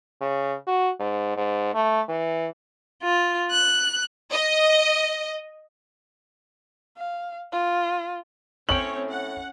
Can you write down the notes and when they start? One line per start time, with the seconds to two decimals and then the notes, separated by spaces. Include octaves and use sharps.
0.21 C#3
0.67 F#4
1.00 G#2
1.37 G#2
1.74 A3
2.08 E3
3.02 F4
3.51 F#6
4.31 D#5
6.97 F5
7.53 F4
8.69 A2 C4 C#4 C#5 G5 F#7
9.10 F#5